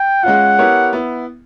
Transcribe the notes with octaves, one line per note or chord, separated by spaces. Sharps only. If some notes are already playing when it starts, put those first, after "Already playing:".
Already playing: G5
G#3 C#4 F4 F#5
B3 E4 G4 A#4 C#5
B3 E4